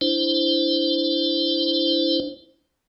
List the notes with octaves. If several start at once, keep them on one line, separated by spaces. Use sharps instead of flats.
D4 E4 C5